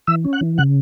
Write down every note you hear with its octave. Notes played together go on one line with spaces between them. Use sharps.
E3 E5 E6
C#4
F#5 F#6
E3
C#3 F#5 F#6